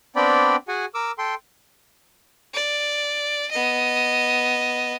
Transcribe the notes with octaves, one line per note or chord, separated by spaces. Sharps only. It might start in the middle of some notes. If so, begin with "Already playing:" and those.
B3 C4 D4 D5 G5 B5
F#4 G#4 F#5 G#5
A#4 D6 E6
A4 G5 C6
D5
B3 D#5